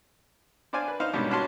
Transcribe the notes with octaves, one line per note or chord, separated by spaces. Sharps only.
D4 C5 D5 F5 G#5
B4
D#4 C5 F5
G#2 B2 G3 A#3 C#4 D4
C#4 D4 F#4 F5 A5 C6